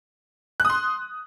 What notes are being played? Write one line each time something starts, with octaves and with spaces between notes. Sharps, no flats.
F#6
D#6
C6